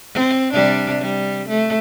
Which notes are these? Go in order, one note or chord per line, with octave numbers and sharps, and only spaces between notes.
C4
C3 G3 D4
G3
A3